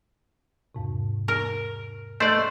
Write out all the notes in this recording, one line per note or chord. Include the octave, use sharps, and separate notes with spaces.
E2 G#2 C3
A#4
A3 C5 D5 D#5 E6 F#6